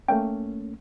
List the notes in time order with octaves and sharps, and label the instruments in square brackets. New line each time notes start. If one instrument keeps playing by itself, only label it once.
[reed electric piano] A3 A#3 C#4 [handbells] G5